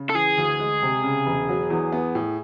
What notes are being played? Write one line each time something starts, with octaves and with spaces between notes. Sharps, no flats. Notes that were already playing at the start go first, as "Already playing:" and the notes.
Already playing: C#3
A4
E3 G#4
D2
G#3
C3
C#3
E1
F#3
E2
B3
A2